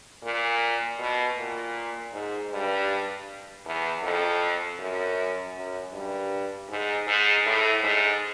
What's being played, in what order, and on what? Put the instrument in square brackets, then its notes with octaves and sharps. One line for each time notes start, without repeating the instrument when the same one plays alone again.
[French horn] A#2
B2
A#2
G#2
G2
E2
F2
F#2
F#2
G2
G#2
G#2
A2
G#2